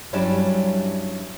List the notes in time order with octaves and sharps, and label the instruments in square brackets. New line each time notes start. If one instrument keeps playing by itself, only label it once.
[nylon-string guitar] G2 F#3 G3 C#4 D4 E4